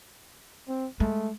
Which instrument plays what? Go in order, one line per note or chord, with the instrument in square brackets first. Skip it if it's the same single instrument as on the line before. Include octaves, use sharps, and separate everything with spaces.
[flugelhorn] C4
[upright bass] G#3 [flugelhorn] A3